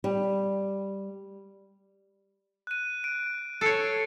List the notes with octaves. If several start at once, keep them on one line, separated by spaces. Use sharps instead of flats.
G3
F#6 D#7
D7
A4 C#5 A6 C7 D7